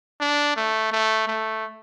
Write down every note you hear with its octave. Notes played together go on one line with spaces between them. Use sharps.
D4
A3
A3
A3